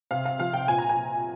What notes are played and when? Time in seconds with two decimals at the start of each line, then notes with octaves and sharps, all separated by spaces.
0.11 C3 F5
0.25 F5
0.40 F3 F5
0.53 G5
0.68 A#2 G#5
0.78 A#5
0.89 G#5
0.97 A#2